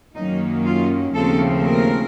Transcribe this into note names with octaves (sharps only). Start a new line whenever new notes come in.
F#2 D#3 F#3 A#3 C#4 D#4
F4
D#2 C#3 F3 A3 C4 A4
A#4